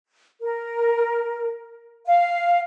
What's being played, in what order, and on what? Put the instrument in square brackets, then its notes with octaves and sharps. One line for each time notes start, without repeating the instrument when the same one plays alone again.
[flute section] A#4
F5